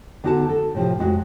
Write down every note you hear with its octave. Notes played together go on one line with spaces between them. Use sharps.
D3 B3 D#4 F#4 A4 A5
A4
A2 C3 F3
F2 G#3 F#4